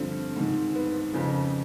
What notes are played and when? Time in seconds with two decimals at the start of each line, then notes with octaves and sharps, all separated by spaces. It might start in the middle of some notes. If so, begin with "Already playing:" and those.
Already playing: G2 D3 F3 C4
0.36 G#2 D#3
0.75 B3
1.13 F2 C#3 F3